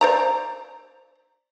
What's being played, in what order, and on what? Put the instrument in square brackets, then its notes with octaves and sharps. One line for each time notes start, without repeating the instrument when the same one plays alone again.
[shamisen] C5 D5 A#5